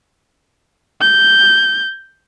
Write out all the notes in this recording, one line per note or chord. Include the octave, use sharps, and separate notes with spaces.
G6